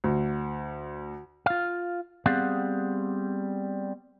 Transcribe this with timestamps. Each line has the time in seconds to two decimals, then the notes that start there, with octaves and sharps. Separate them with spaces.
0.04 D2
1.46 F4 F5
2.26 G3 B3 C4 G#4 F5 F#5